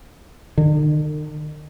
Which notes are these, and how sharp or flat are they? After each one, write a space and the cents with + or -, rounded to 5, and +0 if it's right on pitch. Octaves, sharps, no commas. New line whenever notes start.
D#3 -40